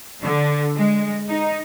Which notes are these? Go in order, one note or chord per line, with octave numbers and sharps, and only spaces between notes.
D3
G#3
D#4